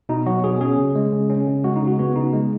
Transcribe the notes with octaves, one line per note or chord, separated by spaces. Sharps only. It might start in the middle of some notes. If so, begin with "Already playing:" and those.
B2 D#4
F#3 F#4
B2 G#4
C#4 G#4
C#3
G#3
C#3
C#4
C#3
G#3 F#4
D#4
C#3
F#4
B3 F#4
C#3 D#4
G#3